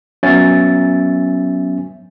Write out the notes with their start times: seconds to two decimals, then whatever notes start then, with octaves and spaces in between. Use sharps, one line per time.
0.23 F#3 B3 C#4 E5 G#5 A6